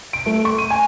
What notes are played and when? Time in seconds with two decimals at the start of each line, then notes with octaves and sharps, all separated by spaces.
0.13 D7
0.26 A3
0.45 C#6
0.58 D#7
0.70 G#5